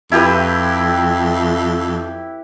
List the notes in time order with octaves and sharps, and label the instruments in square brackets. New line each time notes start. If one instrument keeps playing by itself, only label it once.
[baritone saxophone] F2 [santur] E4 G4 B4